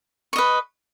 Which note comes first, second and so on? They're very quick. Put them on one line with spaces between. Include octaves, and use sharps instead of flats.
C#6 D#5 B4